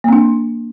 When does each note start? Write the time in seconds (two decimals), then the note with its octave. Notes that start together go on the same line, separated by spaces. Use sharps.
0.04 A#3
0.08 C4
0.13 D4